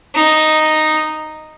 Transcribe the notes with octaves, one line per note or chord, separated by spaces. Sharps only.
D#4